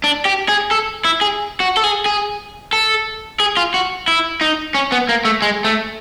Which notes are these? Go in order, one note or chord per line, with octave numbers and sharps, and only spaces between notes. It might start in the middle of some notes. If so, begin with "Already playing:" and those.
D4
G4
G#4
A4
E4
G#4
F#4
A4
G#4
G#4
A4
G#4
F4
F#4
E4
D#4
C#4
B3
A#3
A3
G#3
A3